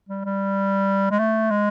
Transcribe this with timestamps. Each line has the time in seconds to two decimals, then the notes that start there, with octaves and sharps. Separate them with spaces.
0.09 G3
0.25 G3
1.11 G#3
1.19 A3
1.51 G#3